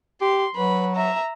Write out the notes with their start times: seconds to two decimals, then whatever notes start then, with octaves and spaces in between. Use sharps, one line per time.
0.21 G4 C6
0.56 F#3 B4 B5
0.96 E5 A#5